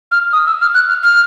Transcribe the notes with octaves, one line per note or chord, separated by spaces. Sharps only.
F6
D#6
E6
F6
F#6
F6
F6